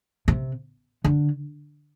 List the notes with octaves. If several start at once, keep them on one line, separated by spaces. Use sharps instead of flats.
C3
D3